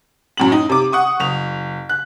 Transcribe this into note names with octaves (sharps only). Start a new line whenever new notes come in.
F#2 A2 F#7
D#4
C3 D6
F#5 C#6 D#6
F#1 F7
F#6